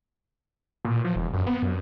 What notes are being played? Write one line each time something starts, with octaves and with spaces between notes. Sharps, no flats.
A#2
F3
E1
F#2
B3
F#2